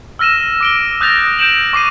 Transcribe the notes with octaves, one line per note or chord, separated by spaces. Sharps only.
E6 F6 A#6 D#7 E7
D6 D7 G7
D#6 F#6 G6 A6 A#6 F7
G6 D7 E7 F#7
C#6 D6 C7 D#7